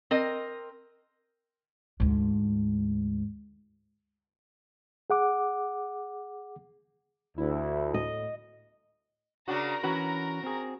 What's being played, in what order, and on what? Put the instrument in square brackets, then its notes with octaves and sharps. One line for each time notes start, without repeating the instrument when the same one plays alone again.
[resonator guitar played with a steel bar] C4 A#4 D#5
[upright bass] D2 G#2
[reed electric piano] G#4 F#5 D6
[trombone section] D2 [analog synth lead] E4
[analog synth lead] A2 [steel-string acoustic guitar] D#5
[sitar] C#3 D4 F#4 [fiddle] A#4 A#5
[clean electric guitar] E3 C#4 B4 [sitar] F#4
[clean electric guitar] C4 G#4